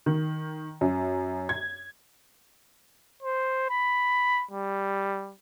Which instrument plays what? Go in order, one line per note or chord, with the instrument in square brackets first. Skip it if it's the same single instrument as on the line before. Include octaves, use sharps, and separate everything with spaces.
[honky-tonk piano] D#3
F#2
G#6
[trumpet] C5
B5
G3